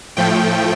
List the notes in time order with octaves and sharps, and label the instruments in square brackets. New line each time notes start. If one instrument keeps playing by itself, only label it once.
[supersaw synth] A2 F3 A3 G5